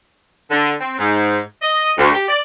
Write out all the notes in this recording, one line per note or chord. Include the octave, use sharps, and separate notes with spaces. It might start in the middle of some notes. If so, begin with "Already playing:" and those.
D3
C4
G#2
D#5
D2
G4
D5